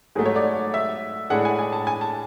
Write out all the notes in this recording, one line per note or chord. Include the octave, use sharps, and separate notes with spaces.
G#2 F#3 A3 G#4
C#5
D5
E5
A2 G#3 D4 G#4 F#5
G#5
G#5
A5
G#5
A5